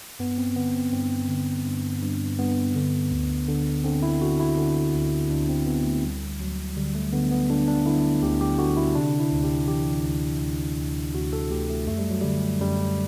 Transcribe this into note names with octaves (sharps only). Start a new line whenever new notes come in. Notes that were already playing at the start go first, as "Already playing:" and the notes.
G2 B3
C4
D3 B3
C4
G2 C4
D3
G2
G2
G2 B3
D3
D2
D3
D3 C4
E4
D3 F#4
E4
D3
D2
D2 D4
C4
D2 B3
A3
D2 G3
D2 F#3
D3 G3
A3
D3 B3
B3
D3 D4
D4
D3 E4
D2 G4
G4
D3 F#4
E4
C3 D4
E4
D2
G4
E3 G4
D2
D2
D2
D2 F#4
A4
D2 G4
A3
F#2 A3
G3
F#3
D3 G3
F#2 G3